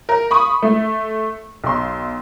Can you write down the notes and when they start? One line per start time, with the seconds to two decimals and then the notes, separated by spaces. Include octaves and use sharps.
0.09 A#4
0.31 B5 C#6 D#6
0.62 A3
1.64 B1 C6